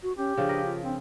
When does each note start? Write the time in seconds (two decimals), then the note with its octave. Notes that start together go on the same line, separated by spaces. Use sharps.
0.03 F#4
0.18 C#4 G4
0.37 C#3 F3 D4
0.49 A#4 B4 D#5
0.65 F4
0.84 C4 D4